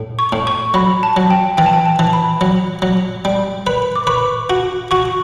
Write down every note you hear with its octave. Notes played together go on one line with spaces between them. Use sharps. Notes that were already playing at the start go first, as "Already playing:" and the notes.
Already playing: A2
C#6
A2
C#6
F#3 B5
A5
F#3
G5
E3 G5
A5
G5
A5
E3
B5
F#3
F#3
G3
B4
D6
B4 C#6
F#4
F#4 C#6